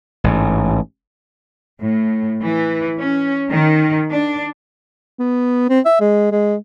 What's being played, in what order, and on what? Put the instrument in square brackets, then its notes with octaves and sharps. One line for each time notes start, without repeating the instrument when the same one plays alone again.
[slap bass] A1 G#2
[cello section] A2
E3
C#4
D#3
D4
[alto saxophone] B3
C4
E5
G#3
G#3